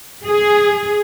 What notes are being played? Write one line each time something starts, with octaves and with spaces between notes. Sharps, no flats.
G#4